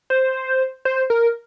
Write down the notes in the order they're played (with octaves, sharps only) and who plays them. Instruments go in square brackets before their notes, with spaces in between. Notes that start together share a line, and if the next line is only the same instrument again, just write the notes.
[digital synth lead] C5
C5
A#4